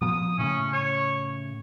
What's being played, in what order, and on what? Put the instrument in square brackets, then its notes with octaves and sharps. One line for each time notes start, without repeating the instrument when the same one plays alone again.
[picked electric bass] A#2 F3 B3 [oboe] D#6
[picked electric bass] A2 C#3 A3 [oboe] C#4
[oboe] C#5